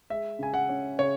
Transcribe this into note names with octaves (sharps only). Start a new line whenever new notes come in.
G#3 E5
C#3 G#5
F#5
C#4
C#3 C#5